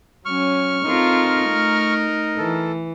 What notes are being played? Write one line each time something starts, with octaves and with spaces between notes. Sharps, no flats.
F#3 C#4 C#6 F6
C4 D#4 F4 A4 A#4
A3
E3 A4